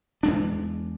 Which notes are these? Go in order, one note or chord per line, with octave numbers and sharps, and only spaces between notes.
E2 G#3 D4